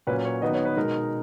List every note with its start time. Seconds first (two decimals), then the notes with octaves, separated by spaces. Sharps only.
0.07 A#2 F#3 C#4 B4
0.25 C#5
0.42 D#3 F#3 B3 D#4 D#5
0.54 C#5
0.65 B4
0.76 B2 G#3 D#4 A#4